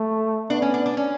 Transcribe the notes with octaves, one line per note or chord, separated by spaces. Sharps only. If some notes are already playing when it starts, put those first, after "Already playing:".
Already playing: A3
B3 D4
C#4
D4
D4
C#4